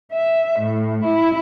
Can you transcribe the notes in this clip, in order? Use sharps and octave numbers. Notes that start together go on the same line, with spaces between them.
E5
A2
E4